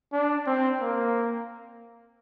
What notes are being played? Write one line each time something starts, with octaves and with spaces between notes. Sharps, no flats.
D4
C4
A#3